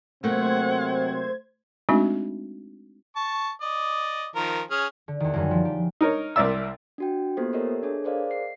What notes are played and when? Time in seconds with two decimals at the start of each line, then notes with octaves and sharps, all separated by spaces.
0.24 C3 F#3 A3 A#3 C4 C5 F#5 G#6
1.89 G#3 A3 C4 D4 D#4 F#4
3.16 A5 C#6
3.61 D5 D#5
4.36 D#3 F3 A#4
4.71 C#4 G#4 F6
5.08 D3
5.20 E2 D#3
5.34 F#2 D#3 G3
5.51 F3
5.65 G4
6.01 D#4 A#4 C#5
6.36 C2 C4 A#4 D5 E5 E6
6.98 D4 F#4 G5
7.37 A#3 B3 F4 G4 A4 C5
7.53 G4 A4 A#4 C#5 D#5 E5
7.83 D4 G#4 A4 C#5
8.04 G#4 A#4 C5 D5 D#5 F5
8.31 C7